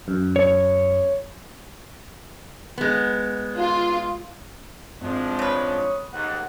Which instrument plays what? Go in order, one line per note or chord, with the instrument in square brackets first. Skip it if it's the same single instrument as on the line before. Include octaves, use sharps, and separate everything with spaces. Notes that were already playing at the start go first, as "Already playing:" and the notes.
[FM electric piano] F#2
[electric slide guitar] C#5
[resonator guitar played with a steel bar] G#3 B3
[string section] F4
[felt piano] G#1 [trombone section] F3 G#3 D4
[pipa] C#3 B4 [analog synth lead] C#5
[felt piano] D#6
[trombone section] D#2 G#2 D#3 [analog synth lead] F#5